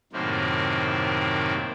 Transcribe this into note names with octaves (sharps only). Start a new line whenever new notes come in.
F#2 A2 C3 D#3 A#3 C4